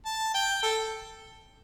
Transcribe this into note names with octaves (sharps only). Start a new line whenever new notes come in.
A5
G5
A4